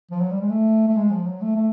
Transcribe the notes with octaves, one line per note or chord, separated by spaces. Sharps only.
F3
F#3
G3
G#3
A3
A3
G#3
F3
F#3
A3
A3